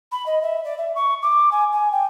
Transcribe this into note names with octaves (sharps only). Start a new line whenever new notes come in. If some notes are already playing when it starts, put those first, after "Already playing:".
B5
D#5
E5
D5
E5
C#6
D6
G#5
G#5
G5